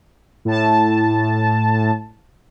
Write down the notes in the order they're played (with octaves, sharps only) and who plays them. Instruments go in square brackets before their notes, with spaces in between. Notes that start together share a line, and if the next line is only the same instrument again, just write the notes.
[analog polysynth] A2 A5